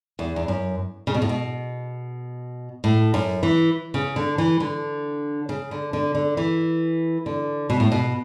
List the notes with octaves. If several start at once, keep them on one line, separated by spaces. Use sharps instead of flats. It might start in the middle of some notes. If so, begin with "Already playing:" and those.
E2
E2
F#2
C#3
B2
A2
B2
A2
F#2
E3
C#3
D3
E3
D3
C#3
D3
D3
D3
E3
D3
B2
A2
B2